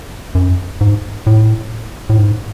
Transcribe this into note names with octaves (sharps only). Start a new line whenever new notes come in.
F#2
G#2
A2
A2
G#2